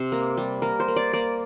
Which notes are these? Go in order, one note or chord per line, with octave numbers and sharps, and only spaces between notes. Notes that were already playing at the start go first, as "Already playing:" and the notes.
Already playing: C3 C5
A#3
G3
A#3 A#4
C5
A#3
D5
A#3 D5